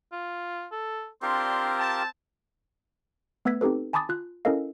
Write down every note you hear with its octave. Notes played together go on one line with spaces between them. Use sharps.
F4
A4
C4 D4 F4 G4 A#4 C6
A5
A3 B3 B4 E6 G#6 B6
C4 D#4 G4 A4 B4
G#5 A5 B5 D6 D#6 A6
F4 F#6
C#4 E4 A4 A#4 D#5 F5